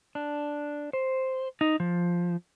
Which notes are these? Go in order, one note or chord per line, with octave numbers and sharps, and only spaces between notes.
D4
C5
D#4
F3